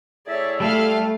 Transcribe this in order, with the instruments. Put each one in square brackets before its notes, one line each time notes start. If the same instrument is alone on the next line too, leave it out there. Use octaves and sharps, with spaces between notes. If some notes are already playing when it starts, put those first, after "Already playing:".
[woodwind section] A2 G#4 E5 [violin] C#5 D5
[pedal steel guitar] G3 A4 [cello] A3 [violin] F5 F6